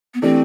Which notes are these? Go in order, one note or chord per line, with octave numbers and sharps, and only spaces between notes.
B3
E3 A3 C4 D4 G4